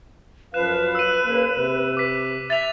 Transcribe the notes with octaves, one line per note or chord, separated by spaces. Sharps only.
F#2 F3 B4 F5 F#6 E7
E6 D#7
C#3 A#3
C3
D6 B6
E5 A6 F7